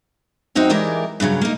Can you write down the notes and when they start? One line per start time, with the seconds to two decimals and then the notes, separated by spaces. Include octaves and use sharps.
0.55 F#2 C4 D#4 F#4 G5
0.70 E3 G#3 G4 A#4 D5
1.20 G2 A#2 C#3 F#3
1.41 A#3 D#4